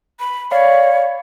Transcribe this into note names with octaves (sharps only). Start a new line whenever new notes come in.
B5
C#5 D5 F5 B5